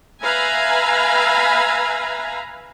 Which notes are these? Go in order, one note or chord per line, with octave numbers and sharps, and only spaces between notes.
B4 E5 F5 G#5 A#5 B5